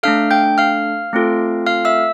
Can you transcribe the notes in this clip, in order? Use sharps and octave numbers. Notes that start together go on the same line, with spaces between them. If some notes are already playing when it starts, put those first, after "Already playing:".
A3 D4 A4 F5 F6
G5 G6
F5 F6
A3 C4 F4 A4
F5 F6
E5 E6